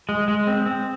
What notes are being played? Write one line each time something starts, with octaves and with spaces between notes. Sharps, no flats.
G#3
G#3
C4
C4